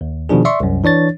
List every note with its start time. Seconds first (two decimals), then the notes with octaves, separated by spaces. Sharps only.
0.01 D#2
0.29 B2 D#3 F3 D4 G#4
0.45 D5 E5 C6 C#6
0.60 C2 F#2
0.84 E3 D4 C#5 A6